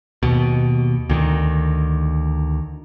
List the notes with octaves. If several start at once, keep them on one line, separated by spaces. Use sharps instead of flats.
D#2 B2
D2 D#3